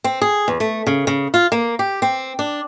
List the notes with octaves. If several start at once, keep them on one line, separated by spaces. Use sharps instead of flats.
C4
G#4
E2
A3
C#3
C#3
F4
A#3
G4
C4
D4